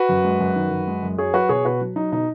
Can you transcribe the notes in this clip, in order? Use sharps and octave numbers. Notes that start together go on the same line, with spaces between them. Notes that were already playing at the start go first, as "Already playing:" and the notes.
Already playing: F#4 B4
F#2
G#3
F#2
D#3
F#2
G#3
F#2
F#3 G#4 C#5
F#3 F#4 B4
B2 G#4 C#5
B2 F#4 B4
F#3
F#3 D#4
B2 D#4